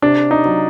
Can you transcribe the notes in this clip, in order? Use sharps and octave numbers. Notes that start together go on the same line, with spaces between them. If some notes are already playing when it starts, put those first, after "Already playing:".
C3 D4
D#4
F#3